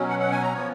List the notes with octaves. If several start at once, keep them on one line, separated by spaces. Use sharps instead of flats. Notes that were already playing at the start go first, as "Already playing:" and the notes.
Already playing: B2 F#3 C#4
F#5
F#5
G#5
A#5
F3 B3 C#5